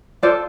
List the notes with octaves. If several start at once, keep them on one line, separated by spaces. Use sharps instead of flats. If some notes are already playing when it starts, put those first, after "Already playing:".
F4 A4 C5 D5